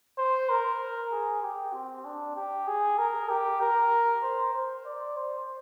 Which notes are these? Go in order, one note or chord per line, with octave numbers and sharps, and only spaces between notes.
C5
A#4
G#4
G4
C4
D4
G4
G#4
A#4
G4
A#4
C5
C5
D5
C5